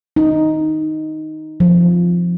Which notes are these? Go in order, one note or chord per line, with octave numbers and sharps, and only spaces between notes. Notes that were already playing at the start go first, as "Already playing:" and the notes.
D#4
F3